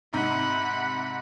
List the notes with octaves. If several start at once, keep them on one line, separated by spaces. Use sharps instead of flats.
G#2 C3 D#4 F#5 B5